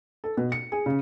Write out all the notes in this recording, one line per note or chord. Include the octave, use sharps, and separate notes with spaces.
A4
B2
C#7
G#4
C#3